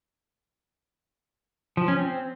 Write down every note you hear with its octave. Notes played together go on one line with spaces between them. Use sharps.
F3
C#4
C4